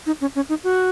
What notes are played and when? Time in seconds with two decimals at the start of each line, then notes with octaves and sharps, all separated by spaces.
0.06 D#4
0.21 C#4
0.36 C#4
0.49 D#4
0.64 F#4